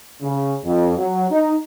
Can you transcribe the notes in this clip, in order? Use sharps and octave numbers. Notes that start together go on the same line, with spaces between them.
C#3
F2
F#3
D#4